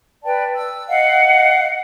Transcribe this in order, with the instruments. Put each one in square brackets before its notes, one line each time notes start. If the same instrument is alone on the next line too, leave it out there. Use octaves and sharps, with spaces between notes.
[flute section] B4 D5 G5 A5
E6
D#5 F5 F#5